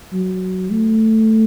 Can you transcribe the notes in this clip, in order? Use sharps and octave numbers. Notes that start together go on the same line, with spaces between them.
F#3
A3